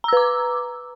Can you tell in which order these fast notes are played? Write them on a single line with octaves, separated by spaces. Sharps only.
A#5 E6 B4 D6